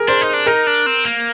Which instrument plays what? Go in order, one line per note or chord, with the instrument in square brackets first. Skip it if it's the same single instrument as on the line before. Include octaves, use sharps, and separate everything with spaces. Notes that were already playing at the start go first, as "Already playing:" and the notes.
Already playing: [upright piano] G#4 A#4
[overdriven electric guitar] D4 [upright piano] C5
[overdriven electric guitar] D#4
D4
[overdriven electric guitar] D#4 [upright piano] A#4
[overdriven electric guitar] D4
C4
A#3